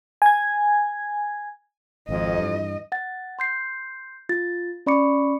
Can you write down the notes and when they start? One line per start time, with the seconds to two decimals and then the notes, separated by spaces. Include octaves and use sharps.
0.22 G#5 G#6
2.09 G#1 F2 D#5
2.38 G2 E3
2.92 F#5 A6
3.39 C6 G6 C7
4.29 F4 A6
4.86 C#4 D5 B5 C#6 D6 C#7